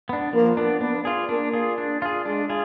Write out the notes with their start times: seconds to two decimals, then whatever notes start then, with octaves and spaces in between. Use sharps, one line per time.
0.09 B3 D4
0.33 F3 A#3 A#4
0.57 B3 D4
0.81 B3 D4 B4
1.05 F4 G#4
1.29 A#3 D4 A#4
1.54 F4 G#4
1.78 D4
2.02 F4 G#4
2.25 G#3 D4 G#4
2.49 F4 G#4